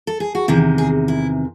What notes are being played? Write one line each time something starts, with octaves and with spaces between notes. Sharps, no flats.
A4
G#4
F#4
E2 C3 D#3 E4
G#4
E4